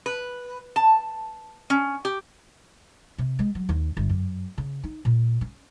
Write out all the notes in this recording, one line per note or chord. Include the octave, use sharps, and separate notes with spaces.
B4
A5
C#4
G4
C3
G#3
F#3
D#2
G1
F#2
C#3
D#4
A#2
C#4